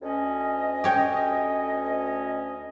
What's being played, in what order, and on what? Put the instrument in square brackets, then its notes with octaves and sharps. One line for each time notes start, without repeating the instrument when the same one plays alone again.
[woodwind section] D2 C#4 D#5
[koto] G4 C#5 G5